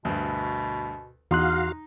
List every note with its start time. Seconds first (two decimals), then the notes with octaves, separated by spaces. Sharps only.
0.05 D2 G2 B2
1.31 E2 D#4 F#4 F5 C6 F#6